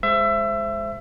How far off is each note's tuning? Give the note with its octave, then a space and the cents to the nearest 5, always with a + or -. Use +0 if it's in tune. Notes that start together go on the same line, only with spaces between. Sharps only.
G#3 +0 C5 +0 E5 +25